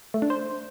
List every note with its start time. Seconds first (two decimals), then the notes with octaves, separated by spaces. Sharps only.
0.14 A3
0.22 D4
0.30 C5